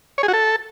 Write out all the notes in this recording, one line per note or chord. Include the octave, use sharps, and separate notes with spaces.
C#5
G#4
F#4
A4